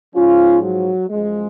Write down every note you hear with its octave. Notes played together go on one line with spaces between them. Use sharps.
G#2 F3 C#4 F4
F#3
F#2 F3 G#3